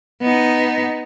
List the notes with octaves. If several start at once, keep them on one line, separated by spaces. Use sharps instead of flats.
B3 D#4